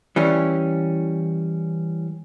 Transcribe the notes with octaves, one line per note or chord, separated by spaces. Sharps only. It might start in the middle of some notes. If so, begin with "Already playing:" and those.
E3 G3 C#4